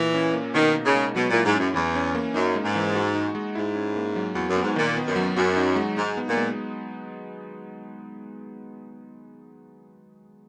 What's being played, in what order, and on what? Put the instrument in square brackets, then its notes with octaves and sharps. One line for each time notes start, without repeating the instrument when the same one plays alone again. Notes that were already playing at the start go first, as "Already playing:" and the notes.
Already playing: [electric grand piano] A#2 [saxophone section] E3
[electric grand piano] C#4
A#3
[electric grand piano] B2 [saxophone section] D#3
[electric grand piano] D#4
[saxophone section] C#3
[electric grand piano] G#3
[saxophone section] B2 [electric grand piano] F#3
[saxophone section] A#2 [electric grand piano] E4
[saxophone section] G#2
[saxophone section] F#2 [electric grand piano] C#4
[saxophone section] E2 [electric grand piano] E3
[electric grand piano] C#4
A#3
[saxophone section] F#2 [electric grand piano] D#4
[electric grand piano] G#3
[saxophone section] G#2
[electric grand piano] E3
F#4
D#4
G#3
[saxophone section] G#2 [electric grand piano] E4
[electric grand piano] C#4
A#3
F#3
[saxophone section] E2 [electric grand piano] F#4
[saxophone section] F#2
[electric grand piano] B3
[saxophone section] G#2
[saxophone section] A#2 [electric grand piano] D#3
[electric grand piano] B3
[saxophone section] F#2
[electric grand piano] F#3
[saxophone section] F#2 [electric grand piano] F#4
[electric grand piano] D#4
G#3
[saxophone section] G#2 [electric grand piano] D#4
[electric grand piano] B3
[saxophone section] A#2
[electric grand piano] G#3